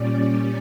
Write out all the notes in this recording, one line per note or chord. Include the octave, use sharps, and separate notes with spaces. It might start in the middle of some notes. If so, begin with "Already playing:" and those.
Already playing: A#2 G3 C#4 D5